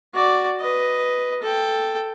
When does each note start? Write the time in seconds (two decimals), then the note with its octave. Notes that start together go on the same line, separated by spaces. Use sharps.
0.14 F#4 D5
0.60 B4 D#5
1.42 A4 G5